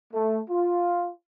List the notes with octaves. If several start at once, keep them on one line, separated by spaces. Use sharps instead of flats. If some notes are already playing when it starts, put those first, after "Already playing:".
A3
F4